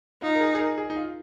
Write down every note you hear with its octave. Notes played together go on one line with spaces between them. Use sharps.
D#4 F4
A#4
G#4
G#4
A#4
G#4
D#4
F4